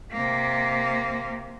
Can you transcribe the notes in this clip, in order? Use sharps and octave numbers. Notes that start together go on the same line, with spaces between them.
C3 A#3